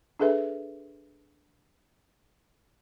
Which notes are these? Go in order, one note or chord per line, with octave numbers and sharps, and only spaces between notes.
D4 G#4 A4 B4 E5